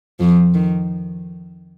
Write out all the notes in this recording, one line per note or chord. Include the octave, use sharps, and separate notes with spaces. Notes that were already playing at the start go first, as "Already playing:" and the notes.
F2 F3
D#3